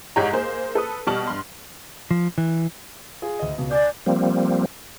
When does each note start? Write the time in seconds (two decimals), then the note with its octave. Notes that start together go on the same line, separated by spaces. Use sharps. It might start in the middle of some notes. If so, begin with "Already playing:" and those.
0.16 C2 G#2 D#4 G4 C#5 A#5
0.33 A#3 G#4 C5
0.75 A4 B4 D#6
1.07 B2 G3 A5 C#6 F6 F#7
1.27 G2 C6
2.11 F3
2.38 E3
3.22 F4 G#4
3.39 D2 D#5
3.58 C#2 B2
3.71 D5 G#5 D6 G6
4.06 F3 G3 A#3 C4